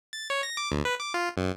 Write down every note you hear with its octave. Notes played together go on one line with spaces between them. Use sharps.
A6
C#5
A#6
D6
D2
B4
D6
F4
F#2